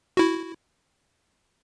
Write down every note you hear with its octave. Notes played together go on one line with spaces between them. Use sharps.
E4 F#4